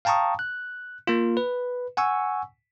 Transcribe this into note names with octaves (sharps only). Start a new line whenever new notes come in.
F5 G5 A5 A#5 C#6 D#6
F#6
A#3 F4
B4
F#5 G#5 C#6 E6